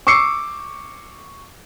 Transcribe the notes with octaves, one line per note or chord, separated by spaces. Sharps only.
C#6 D6 E6 C7 C#7